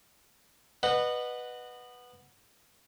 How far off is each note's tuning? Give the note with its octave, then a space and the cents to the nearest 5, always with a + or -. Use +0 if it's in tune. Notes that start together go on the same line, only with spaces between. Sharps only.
B4 +0 D#5 -25 F#5 -5